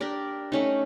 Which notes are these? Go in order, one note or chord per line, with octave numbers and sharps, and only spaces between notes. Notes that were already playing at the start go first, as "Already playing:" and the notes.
D4 G4 A#4 D5
A3 C#4 D#4